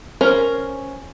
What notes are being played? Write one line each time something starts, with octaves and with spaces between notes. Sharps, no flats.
C#4 A#4 C5